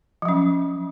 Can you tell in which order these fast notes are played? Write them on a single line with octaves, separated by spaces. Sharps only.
F3 F#3 C#4